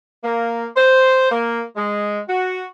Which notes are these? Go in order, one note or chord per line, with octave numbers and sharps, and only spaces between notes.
A#3
C5
A#3
G#3
F#4